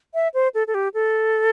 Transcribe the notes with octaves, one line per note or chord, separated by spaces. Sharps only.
E5
C5
A4
A4
G4
A4